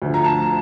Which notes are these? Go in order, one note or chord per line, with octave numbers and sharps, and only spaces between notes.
D2 D3 F3
A#5
A5